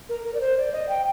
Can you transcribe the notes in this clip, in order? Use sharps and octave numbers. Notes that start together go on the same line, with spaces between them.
A#4
A#4
D5
C5
D5
D#5
G5